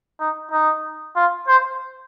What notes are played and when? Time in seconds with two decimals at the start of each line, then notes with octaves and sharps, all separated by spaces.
0.20 D#4
0.51 D#4
1.16 F4
1.47 C5